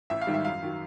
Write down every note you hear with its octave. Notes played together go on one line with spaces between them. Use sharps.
A1 E5
F5
G#2 D#3 G3
E5
F#2 F5
D#3 F#3